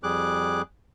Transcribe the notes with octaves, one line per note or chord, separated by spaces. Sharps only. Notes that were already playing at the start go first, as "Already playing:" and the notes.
F2 G3 G#4 D6 F#6